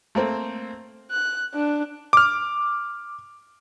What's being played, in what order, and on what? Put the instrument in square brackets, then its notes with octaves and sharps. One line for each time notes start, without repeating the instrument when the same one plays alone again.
[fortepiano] A3 A#3 C4 C5
[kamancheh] F#6
D4
[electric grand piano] D6 F6